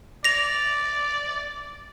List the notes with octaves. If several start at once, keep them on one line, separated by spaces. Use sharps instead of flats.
D5 A#6 F7